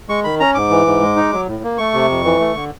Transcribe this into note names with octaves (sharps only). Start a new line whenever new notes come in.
G#3 C#6
D#3 B5
C#4 A#5
G#2 D6
E3
G#2
G#3
D#4
F#3
A2
A#3
A3 C#6
C3
F2
E3
A3
D3